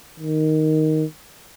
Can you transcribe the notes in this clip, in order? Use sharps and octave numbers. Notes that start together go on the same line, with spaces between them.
D#3